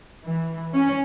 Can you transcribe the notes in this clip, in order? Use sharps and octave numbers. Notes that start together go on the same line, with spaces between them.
E3
C#4